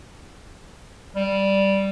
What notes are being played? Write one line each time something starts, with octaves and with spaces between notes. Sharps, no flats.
G3